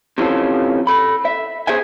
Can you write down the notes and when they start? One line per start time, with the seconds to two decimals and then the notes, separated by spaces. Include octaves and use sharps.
0.18 C3 E3 F3 C#4 F4 A4
0.87 A4 B5
1.25 E5
1.67 G#4 C5 E5 G#5